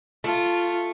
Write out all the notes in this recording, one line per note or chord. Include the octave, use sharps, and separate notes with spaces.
A3 F4